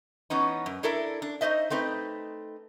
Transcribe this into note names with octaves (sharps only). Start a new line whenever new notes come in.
E3 B3 C#4 D#4
F#2
D4 E4 A4 A#4 D5 E5
D4
D#4 F4 C5 D#5 E5
A3 C4 D#4 B4